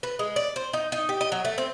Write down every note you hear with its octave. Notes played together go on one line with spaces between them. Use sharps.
B4
G#3
D5
C5
D#4
D#4
G4
D#5
F#3
A3
C4